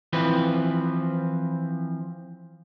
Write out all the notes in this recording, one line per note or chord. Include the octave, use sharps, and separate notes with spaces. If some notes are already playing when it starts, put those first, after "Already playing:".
E3 F3 C4 B4